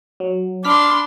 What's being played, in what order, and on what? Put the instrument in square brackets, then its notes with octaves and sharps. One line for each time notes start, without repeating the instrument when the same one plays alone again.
[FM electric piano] F#3
[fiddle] D4 C6 [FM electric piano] B5 F6 B6 [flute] D6